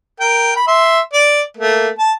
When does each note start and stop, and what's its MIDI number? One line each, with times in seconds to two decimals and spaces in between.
0.20 0.54 70
0.20 0.54 79
0.56 0.67 83
0.67 1.00 76
0.67 1.00 84
1.13 1.42 74
1.57 1.89 57
1.57 1.89 58
1.99 2.12 81